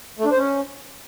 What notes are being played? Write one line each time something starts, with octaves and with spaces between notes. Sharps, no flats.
A3
D4
C5
C#4